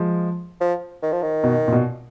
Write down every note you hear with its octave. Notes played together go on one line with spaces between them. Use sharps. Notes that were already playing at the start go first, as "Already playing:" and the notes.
Already playing: F3 G#3
F3
D#3
F3
D#3
B2
A#2
B2